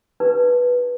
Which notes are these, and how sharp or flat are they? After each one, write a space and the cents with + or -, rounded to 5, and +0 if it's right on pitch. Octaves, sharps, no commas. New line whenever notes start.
D#4 +0 G4 +0 B4 -10